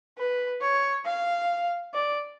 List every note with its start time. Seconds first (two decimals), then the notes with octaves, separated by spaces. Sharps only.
0.18 B4
0.61 C#5
1.05 F5
1.94 D5